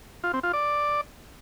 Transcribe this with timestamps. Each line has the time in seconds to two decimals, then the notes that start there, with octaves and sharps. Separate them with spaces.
0.24 F4
0.34 C4
0.43 F4
0.53 D5